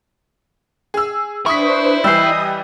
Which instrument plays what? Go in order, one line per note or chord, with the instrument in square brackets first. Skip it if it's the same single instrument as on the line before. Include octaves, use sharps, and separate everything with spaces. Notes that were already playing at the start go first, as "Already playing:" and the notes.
[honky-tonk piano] G#4 E6
[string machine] D4 B4 C5 [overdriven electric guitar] E4 [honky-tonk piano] C#6 D#6 B6
[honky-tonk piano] E3 G3 [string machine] D#5 D#6 [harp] E6 G6 C7